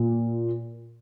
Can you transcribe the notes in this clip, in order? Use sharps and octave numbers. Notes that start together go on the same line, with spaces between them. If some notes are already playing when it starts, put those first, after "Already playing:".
Already playing: A#2